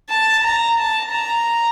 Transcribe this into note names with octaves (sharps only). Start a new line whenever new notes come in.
A5
A#5
A5
A#5